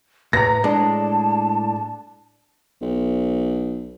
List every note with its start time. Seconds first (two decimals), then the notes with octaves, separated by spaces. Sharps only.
0.33 A2 B4 A#5 A#6
0.64 A2 G#3 D4 A5
2.82 B1